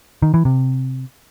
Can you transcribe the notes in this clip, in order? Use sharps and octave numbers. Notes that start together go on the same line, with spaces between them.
D#3
E3
C3